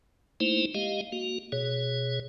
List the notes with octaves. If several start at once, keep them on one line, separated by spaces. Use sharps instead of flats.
A3 A#3 D#4 E4 C5
G#3 G4 D#5 F5
A#3 F#4
B2 G#4 C#5